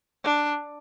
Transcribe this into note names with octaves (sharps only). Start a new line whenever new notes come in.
D4